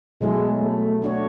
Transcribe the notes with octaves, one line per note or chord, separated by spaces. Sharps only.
B2 F#3 G#3 A3 E4 A4
A3
A3 D4 F#4 C#5